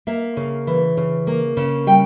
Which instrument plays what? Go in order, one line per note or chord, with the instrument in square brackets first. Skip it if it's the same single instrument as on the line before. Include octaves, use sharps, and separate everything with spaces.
[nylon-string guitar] A#3 E5
C#3
E3
C#3
A#3
C#3
G3 G5